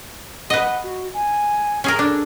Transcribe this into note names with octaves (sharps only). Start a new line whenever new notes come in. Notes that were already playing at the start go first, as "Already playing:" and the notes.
B4 D#5 F#5
F#4
G#5
C#4 G#4 A#4
D4 A4